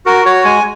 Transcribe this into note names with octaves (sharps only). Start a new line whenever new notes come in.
F#4 A#4
F#4 C#5
G#3 G#5